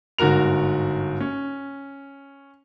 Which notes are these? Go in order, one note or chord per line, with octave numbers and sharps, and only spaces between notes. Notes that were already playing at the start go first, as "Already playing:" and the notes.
G1 G#2 F#4 A#4 F7
C#4